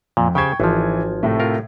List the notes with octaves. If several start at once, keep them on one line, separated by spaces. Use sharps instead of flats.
F2 A#2
C#3 G4 C5 G5 C#6 G#6
G#1 E3 F3
A2 C3 A3
F4 A#4